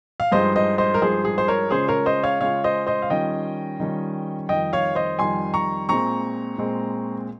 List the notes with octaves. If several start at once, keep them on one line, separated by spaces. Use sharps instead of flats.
F5
G2 F3 G#3 D#4 C5 D#5
C5 D#5
C5 D#5
A#4
G2 F3 G#3 D#4 G#4 C5
G#4
C5
A#4 C#5
C#3 G#3 C#4 F4 G#4 C5
A#4 C#5
C5 D#5
C#5 F5
C#3 G#3 C#4 F4 C#5 F5
C5 D#5
C5 D#5
F5
D#3 G3 C#4 F4 D#5 G5
D#3 G3 C#4 F4
F2 D#3 G3 D#5 G5
C#5 F5
C5 D#5
F2 D#3 G3 G#5 C6
A#5 C#6
A#2 G#3 C4 A#5 C#6
A#2 G#3 C4